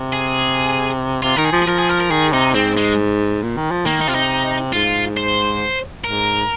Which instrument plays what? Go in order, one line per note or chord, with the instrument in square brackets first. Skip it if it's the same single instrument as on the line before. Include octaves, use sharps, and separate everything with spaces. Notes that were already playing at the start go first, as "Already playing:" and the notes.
Already playing: [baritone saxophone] C3
[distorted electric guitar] G#4
[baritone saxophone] C3 [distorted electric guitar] F4
[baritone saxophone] D#3 [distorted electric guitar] A#4
[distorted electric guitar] G#4
[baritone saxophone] F3
[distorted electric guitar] G#4
[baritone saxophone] F3 [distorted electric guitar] A#4
[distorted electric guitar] G#4
A#4
A#4
[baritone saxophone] D#3 [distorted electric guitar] G#4
[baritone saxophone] C3 [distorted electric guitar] D#4
[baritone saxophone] G#2 [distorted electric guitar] C4
[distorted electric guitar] G#3
[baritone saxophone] A#2
D#3
F3
[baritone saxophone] D#3 [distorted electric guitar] A#3
[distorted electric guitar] D#4
[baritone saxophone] C3 [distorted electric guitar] F4
[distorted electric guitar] D#4
[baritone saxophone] G#2 [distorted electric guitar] F4
[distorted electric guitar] C5
[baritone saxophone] G#2 [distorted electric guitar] A#4